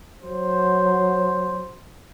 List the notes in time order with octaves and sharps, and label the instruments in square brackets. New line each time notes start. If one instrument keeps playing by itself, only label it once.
[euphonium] F#3 [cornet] C5